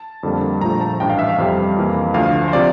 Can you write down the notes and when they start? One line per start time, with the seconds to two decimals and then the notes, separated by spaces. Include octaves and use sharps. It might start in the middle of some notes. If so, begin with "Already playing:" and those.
Already playing: A5
0.23 F2 D3 G3 A#3
0.61 A#1 A#2 F3 A3 A#5
0.81 A5
1.00 A1 G2 E3 G5
1.10 F5
1.19 E5
1.29 F5
1.38 F2 C3 G3
1.76 F2 E3 A#3
2.14 D2 D3 F3 A3 F5
2.48 C5
2.53 C3 F3 D5